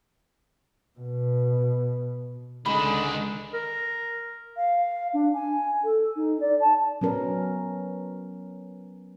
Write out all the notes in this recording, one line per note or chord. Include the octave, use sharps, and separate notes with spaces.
B2
C#2 D3 D#3 G#3 D4 B5
A#4
F5
D4
G#5
A4
D#4
D5
A5
F#3 B3 C#4 A#4